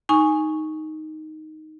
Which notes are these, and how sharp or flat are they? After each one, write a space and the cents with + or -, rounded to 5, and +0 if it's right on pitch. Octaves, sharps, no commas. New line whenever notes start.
D#4 +0 G#5 +0 C#6 +0